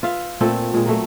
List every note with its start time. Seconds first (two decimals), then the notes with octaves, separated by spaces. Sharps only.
0.03 F4 B4 E5 F5
0.41 A#2 A3 C4 A4
0.74 A#2 G#3
0.86 F#3 A3